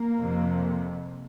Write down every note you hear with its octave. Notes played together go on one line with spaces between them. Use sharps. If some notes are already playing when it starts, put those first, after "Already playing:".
Already playing: A#3
F2 C3